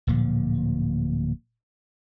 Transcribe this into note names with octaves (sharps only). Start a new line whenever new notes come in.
D1 A#2 F3